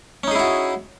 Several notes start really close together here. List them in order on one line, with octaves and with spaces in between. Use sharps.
C#4 D#4 G#4 E4 F#4